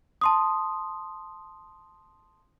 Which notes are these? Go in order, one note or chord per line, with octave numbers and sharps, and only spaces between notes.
A5 C6 D#6